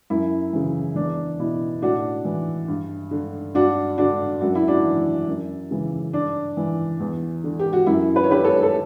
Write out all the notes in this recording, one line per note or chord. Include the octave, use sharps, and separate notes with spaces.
F#2 E4
C#3 E3
E2 D4
B2 E4
A2 D4 F#4
E3
G2
D3
G2 D4 F#4
D3 D4 F#4
F#2 F#4
E4
D4 F#4
E3
F#2
C#3 E3
G2 D4
E3
E2
D3
G4
F#4
F#2 E4
B4
C#5
D3 G4 B4
A4 C#5
A4